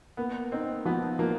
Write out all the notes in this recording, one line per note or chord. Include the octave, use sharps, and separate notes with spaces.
A#3 B3
C4 D#4
F3 B3
F3 A#3